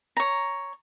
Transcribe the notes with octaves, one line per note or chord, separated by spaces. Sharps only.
C#5 A#5